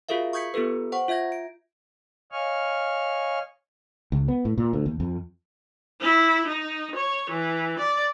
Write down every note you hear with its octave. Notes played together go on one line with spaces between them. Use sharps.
F4 F#4 G#4 A#4 E5 F5
C#6 D#6 G6 G#6 B6 C#7
B3 F4 G4 A4 B4
C5 F#5 C#6
F4 E5 G6 G#6 A#6
D7
C#5 D#5 F5 G#5 C#6 F6
C#2
B3
A2
A#2
D2
D#2
F2
E4
D#4
C#5
E3
D5